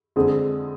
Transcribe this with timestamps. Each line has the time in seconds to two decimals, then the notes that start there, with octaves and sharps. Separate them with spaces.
0.16 F2 D3 G#3 C4 G#4